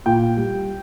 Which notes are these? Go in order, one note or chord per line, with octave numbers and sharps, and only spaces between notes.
A#2 G5
G3